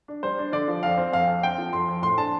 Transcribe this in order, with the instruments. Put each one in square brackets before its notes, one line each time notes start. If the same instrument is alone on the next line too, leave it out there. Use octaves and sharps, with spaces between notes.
[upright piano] D4
G3 C5
D4
D3 D5
F3
F2 F5
C4
F2 F5
F2
C4 G5
F3
F2 C6
F2
A2 C6
D4 A5